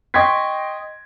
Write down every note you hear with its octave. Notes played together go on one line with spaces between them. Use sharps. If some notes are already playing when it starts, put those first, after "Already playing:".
D#5 G5 C6 C#6 G#6 B6